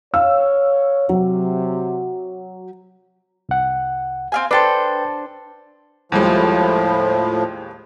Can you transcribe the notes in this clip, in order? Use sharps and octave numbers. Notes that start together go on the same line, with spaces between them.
C#5 F5 E6
C3 F#3
C2 F#5
C4 F5 G#5
D4 A4 B4 C5 G5
D#2 A2 F3 G3 G#3